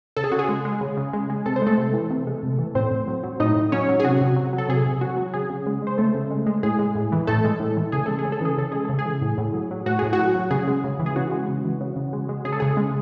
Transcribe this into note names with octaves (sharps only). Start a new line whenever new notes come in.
C#3 A4
G#4
C#3 F#4
G#4
G#3
G#3
C#3
C#3
G#3
G#3
C3 A4
C5
G#3 A3 A4
C3
E3
C3
G#3
C3
E3
A2 C4 C5
A2
F#3
F#3
A2 D#4 D#5
A2
F#3 C#4 C#5
F#3
G#4
C3 F#4
C3
F#3
F#3
A4
C3 G#4
C3
F#3 F#4
F#3
C#3 G#4
C#3
G#3
G#3 C5
C#3 A3 A4
C#3
G#3
G#3
A2 G#4
G#3
A2
E3
A2 A3 A4
G#3
A2
E3
C#3 G#4
G#3 A4
G#4
C#3
A4
E3 G#4
C#3 A4
G#3 G#4
C#3 A4
G#4
E3
A2
A2
F#3
F#3
A2 F#4
A2 G#4
F#4
F#3
F#3
C#3 G#4
G#3
C#3
E3
G#4
C#3 F#4
G#3
C#3
E3
C#3
C#3
G#3
G#3
C#3 G#4
A4
C#3 G#4
G#3